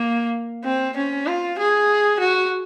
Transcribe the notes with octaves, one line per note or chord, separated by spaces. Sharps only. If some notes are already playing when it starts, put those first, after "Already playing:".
Already playing: A#3
C4
C#4
F4
G#4
F#4